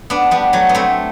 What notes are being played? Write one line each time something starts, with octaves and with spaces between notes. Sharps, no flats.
B3 D4
G3 B3
F#3 A3
B3
A3 C4